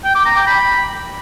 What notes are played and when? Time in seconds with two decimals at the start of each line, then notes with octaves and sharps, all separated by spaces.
0.04 G5
0.15 D6
0.26 A#5
0.36 G5
0.47 B5